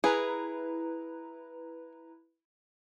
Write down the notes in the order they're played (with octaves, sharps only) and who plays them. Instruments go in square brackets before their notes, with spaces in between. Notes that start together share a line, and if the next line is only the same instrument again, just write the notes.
[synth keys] E4 B4 A#5 [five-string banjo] G#4